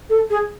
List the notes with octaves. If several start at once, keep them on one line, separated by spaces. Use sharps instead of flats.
A4
G#4